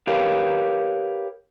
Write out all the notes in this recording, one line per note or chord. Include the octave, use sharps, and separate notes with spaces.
G4 A#4 B4 C#5 F5